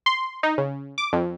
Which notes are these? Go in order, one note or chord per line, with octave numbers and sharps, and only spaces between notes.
C6
D#4
C#3
D6
F2